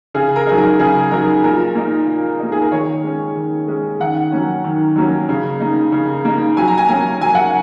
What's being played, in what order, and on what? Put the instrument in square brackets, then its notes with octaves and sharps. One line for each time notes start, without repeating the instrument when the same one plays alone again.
[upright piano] C#3 G#4
A#4
F#3 D#4 G#4
A#4
C#3 G#4
F#3 D#4 A#4
A#2 A#4
A#3 D#4
A#2
A#3 D#4
G#4
A#4
D#3 C#5
G#3 C#4
D#3
G#3 C#4
D#3 F#5
F#3 A#3 C#4
D#3
F#3 A#3 C#4
C#3
A#3 D#4
C#3
A#3 D#4
F#3 G#5
A#5
G#5
A#3 C#4 G#5
F#3 G#5
F#5